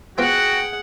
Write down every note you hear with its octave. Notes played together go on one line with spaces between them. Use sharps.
F3 B3 F4 F#4 G#4 F#5 G5